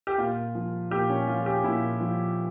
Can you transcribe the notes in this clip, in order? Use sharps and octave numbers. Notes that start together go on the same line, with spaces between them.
G4
A#2 F4
F3
A#2 G4
C#4
F3 F4
G#4
G4
A#2 E4
F3